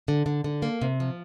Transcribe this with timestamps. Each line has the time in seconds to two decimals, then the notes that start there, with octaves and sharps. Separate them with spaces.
0.08 D3
0.26 D3
0.44 D3
0.62 A#3
0.82 C3
1.00 F3